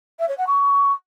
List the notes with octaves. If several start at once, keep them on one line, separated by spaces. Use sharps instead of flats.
E5
C#5
F#5
C#6